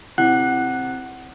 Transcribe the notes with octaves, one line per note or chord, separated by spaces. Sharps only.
C3 E4 F#5 F#6